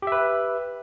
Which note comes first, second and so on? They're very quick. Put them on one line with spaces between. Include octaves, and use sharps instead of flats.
G4 E5 B4